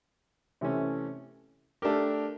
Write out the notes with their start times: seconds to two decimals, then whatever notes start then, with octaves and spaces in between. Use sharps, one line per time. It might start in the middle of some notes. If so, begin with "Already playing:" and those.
0.61 C3 E3 A3 C#4
1.82 A3 D4 G4 A#4